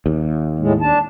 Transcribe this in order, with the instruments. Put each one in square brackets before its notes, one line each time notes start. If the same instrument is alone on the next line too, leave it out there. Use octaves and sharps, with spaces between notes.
[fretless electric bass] D#2
[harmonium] A2 G#3
D4 A5